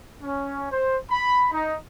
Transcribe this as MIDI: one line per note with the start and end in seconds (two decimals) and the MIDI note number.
0.22 0.67 61
0.70 0.97 72
1.09 1.46 83
1.51 1.75 63